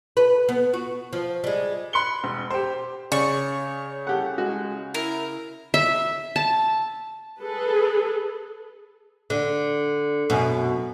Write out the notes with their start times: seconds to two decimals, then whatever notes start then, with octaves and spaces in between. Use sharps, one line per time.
0.17 B4
0.49 B3
0.74 F#4
1.13 F3
1.44 G3 G#3
1.93 B5 C6 F#6 C#7 G7
2.24 E1
2.50 G4 C5
3.12 C#3 C#5 D5 C#6
4.07 G4 A4 F#5
4.38 G#3 F#4
4.94 E4 A#4
5.74 E5
6.36 A5
7.40 G#4 A4 B4
9.30 D3
10.30 F#2 B2